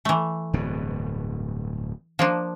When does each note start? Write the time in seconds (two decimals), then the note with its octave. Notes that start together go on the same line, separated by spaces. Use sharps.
0.05 E3 A3
0.53 D1 G2 B2
2.19 F3 A#3 D4